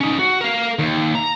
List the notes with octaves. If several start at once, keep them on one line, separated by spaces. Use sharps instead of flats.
C#4 D#4
F#4
A#4 F5
D#2
A#5